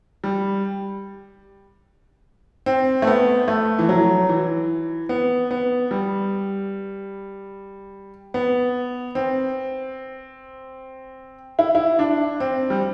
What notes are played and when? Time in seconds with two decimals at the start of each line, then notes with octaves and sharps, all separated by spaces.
0.24 G3
2.66 C4
3.02 A3
3.07 B3
3.48 A3
3.79 E3
3.89 F#3
4.29 E3
5.09 B3
5.51 B3
5.91 G3
8.34 B3
9.15 C4
11.59 E4
11.75 E4
11.99 D4
12.40 C4
12.70 G3